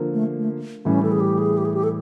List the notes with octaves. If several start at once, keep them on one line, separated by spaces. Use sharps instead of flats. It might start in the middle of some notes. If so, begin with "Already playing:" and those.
Already playing: D3 F3 A#3
A3
A3
A2 E3 G3 C#4
A4
G#4
G4
G#4
G4
G#4
G4
A4